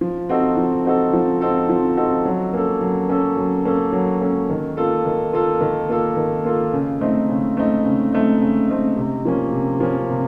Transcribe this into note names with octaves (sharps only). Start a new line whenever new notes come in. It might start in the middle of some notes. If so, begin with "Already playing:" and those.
F3
C4 D#4 F#4 A4
F3
C4 D#4 F#4 A4
F3
C4 D#4 F#4 A4
F3
C4 D#4 F#4 A4
F#3
A#3 C#4 A4
F#3
A#3 C#4 A4
F#3
A#3 C#4 A4
F#3
A#3 C#4 A4
D#3
A#3 F4 A4
D#3
A#3 F4 A4
D#3
A#3 F4 A4
D#3
A#3 F4 A4
C#3
A3 C4 D#4
C#3
A3 C4 D#4
C#3
A3 C4 D#4
C#3
A3 C4 D#4
C3
F3 A#3 C#4
C3
F3 A#3 C#4
C3